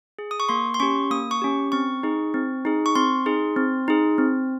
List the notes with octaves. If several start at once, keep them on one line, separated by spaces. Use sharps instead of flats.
G#4
D#6
C#6
A#3 C6
C6
C#4 G4 C#6
A#3 D#6
C#6
C#4 G4
C4 C#6
D#4 G#4
C4
D#4 G#4
C#6
C4 C6
D#4 G#4
C4
D#4 G#4
C4